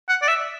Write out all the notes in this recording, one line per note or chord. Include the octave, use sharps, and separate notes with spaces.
F#5
D5
E5